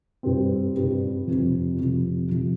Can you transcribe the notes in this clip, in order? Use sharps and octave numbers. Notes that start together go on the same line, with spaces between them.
G2 G3 C4
G2 G3 C4
F2 C3 F3
F2 C3 F3
C3 F3